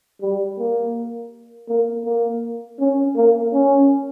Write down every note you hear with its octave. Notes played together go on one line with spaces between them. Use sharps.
G3
A#3
A#3
A#3
C#4
A#3
C#4